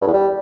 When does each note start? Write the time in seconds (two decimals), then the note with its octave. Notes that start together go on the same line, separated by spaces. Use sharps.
0.01 G2
0.07 E2
0.13 G3